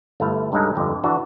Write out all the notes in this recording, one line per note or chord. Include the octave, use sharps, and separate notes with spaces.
G1 A3 E4 F5
C#2 G2 C#3 G#3 D#4 A4
G1 F2 D3
E3 D4 F#4